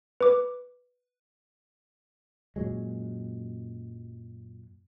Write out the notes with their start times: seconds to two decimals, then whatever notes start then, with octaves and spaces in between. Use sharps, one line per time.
0.21 B4 D6
2.56 F#2 A#2 F#3 G#3